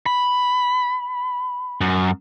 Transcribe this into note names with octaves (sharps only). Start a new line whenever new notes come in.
B5
F#2